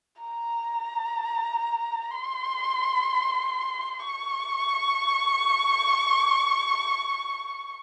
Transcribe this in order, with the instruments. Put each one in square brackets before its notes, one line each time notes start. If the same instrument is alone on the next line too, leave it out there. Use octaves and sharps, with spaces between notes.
[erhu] A#5
C6
C#6